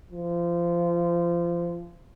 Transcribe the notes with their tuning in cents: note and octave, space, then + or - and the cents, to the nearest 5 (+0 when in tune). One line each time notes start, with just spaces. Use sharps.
F3 -25